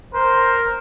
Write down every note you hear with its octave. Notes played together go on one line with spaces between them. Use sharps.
A#4 C5